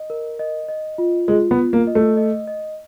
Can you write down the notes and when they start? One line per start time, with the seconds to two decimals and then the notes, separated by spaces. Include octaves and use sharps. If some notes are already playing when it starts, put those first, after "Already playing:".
Already playing: D#5
0.10 A#4
0.39 D#5
0.69 D#5
0.98 F4
1.28 G#3 F4
1.51 B3
1.58 F4
1.73 A#3
1.87 D#5
1.95 A3
2.17 D#5
2.48 D#5